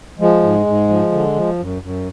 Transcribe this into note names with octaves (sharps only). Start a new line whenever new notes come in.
F3 G#3
G#2
G#2
F3
D3
F3
F#2
F#2